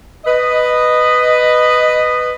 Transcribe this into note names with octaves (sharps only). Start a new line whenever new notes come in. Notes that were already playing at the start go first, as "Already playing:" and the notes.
B4 D#5